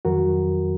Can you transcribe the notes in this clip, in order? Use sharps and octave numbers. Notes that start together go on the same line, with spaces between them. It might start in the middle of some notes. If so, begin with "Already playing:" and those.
F2 D#3 F#3 F#4 A#4